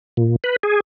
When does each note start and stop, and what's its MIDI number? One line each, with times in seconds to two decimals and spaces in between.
0.17 0.36 46
0.44 0.56 71
0.63 0.80 68